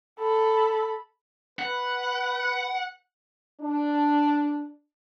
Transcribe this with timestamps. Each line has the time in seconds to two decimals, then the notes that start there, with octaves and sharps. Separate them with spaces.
0.20 A4 B5
1.59 B4 F#5
3.61 D4